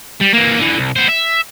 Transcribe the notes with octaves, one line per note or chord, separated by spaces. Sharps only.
G3
E3 A#3
D3 E3
C2
B3 C5
E5